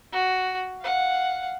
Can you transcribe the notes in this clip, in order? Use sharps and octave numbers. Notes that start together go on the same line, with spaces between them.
F#4
F5 F#5